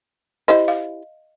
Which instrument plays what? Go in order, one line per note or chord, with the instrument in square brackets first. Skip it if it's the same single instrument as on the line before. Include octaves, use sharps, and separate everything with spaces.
[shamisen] E4 G4 C5 [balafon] D#5
[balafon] F5